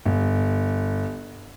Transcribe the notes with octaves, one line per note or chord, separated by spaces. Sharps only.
G1